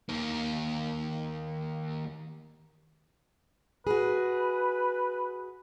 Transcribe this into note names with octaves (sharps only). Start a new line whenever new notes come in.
D#2 D#3
F#4 G#4 B4